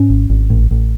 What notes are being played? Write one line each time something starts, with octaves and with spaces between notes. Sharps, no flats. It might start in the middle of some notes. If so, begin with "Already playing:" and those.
Already playing: G#2 C#4
G#1
G#1
A1
A1